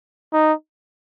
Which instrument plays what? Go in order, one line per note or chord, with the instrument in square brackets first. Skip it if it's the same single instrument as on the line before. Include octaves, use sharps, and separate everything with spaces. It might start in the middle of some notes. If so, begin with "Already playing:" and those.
[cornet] D#4